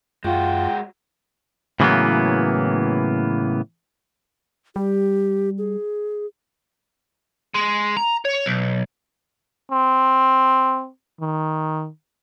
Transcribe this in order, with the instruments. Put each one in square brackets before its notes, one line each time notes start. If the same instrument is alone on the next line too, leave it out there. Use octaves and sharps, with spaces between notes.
[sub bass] F#2 [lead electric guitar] G#3 F#4 [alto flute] F4 [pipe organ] G5
[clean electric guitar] A2 C#3 E3 F#3 A#3 B3
[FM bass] G3 [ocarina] G4
[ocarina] G#4
[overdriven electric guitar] G#3
A#5
C#5
B1
[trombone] C4
D#3